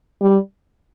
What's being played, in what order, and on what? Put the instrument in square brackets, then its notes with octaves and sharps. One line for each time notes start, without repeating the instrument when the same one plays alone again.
[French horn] G3